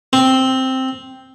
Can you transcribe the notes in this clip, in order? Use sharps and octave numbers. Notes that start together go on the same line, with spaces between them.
C4